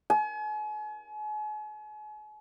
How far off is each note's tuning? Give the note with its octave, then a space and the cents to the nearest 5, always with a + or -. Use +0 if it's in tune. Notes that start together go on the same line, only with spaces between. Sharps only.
G#5 +40